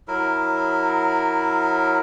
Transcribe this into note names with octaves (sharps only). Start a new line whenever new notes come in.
F#3 E4 A#4